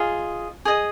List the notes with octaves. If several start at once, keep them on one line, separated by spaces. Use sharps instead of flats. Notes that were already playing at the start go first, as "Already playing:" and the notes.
Already playing: F4 G#4 D#5
G#4 D#5